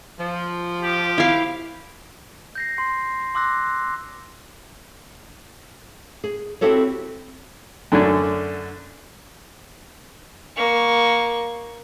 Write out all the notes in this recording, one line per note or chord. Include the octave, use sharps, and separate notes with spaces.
F3
G4
E4 F5
G6 A#6 C7
C6 C7
C6 D6 E6 F#6 A#6
G#4
C4 E4 F#4 G4 A4 C#5
F#2 D3 A3 C#4 D4
A#3 C#6